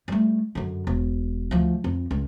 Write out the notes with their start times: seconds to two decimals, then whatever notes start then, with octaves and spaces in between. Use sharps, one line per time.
0.08 G3 A3
0.55 F#2 D3
0.87 E1
1.51 D2 F3
1.84 F2
2.11 C#2